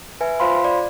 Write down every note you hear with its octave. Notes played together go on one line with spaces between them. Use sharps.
B4 E5 G#5
F4 C5 F5 B5 C6
D5